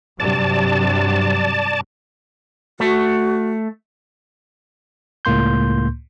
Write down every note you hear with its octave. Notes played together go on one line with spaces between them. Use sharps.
G2 C3 F#3 D5 A5
A3 F#4
C#2 A2 A#3 C6 G6